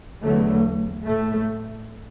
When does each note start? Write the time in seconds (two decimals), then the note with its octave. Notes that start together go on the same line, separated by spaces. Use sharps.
0.23 E2 D3 F#3 A3
1.06 A2 A3